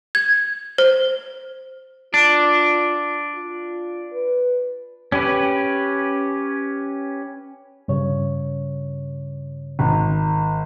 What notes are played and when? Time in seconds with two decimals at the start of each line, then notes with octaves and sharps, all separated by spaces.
0.15 G#6
0.78 C5
2.14 D4 F4
3.35 F4
4.13 B4
5.12 C#4 G4 B4
7.88 G2 C#3 C#5
9.79 G#1